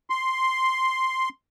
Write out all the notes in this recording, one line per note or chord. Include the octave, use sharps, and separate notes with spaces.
C6